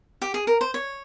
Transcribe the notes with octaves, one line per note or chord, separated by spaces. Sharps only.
G4
G#4
A#4
C5
C#5